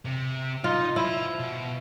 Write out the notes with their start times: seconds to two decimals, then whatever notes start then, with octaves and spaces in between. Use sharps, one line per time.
0.05 C3
0.64 D#4 F4 D#5
0.96 E4 F4 C5
1.40 B2